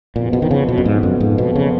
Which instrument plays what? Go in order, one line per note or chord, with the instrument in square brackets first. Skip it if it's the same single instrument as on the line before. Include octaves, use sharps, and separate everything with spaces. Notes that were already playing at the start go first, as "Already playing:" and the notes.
[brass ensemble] F#1 F2 F3 B3 [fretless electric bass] A#2
[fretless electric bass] B2
D#3
C#3
B2
F#2
G#2
F#2
G#2
B2
C#3